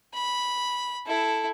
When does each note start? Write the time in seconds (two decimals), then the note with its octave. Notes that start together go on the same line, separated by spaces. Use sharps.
0.14 B5
1.06 E4 A4